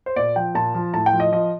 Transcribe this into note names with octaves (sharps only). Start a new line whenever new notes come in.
C5
A#2 D5
F3 G5
A#2 A5
F3
A2 A5
G5
F3
D#5
F3 D#5